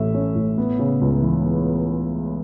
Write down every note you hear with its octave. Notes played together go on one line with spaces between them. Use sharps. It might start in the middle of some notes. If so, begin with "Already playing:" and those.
Already playing: A1 A2 A3 E5
C#4
A2
B3
C#3
C#2
E3
B3